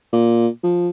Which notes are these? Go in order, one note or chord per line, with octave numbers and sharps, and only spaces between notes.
A#2
F3